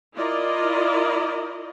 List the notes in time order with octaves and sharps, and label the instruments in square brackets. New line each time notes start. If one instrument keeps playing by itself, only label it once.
[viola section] E4 F4 A#4 D5 D#5